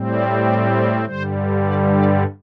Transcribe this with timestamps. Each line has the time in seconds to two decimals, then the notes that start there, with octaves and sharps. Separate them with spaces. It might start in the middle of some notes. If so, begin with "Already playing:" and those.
Already playing: A2 G3 C4
0.15 D5
0.45 D5
0.75 C5
1.04 G2 D3 G3 C5
1.65 D5
1.95 D5